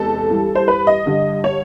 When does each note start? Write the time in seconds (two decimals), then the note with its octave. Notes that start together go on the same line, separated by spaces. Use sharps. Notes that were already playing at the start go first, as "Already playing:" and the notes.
Already playing: E2 C3 G#3 A4
0.30 G2 E3 G3
0.55 C5
0.68 B4
0.87 D#5
1.06 G2 D3 G3
1.44 C#5